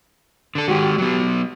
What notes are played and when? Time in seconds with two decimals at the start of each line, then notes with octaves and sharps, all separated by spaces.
0.55 D3 A4
0.68 D#3 G#3 F#4 G4
0.98 F#3 B3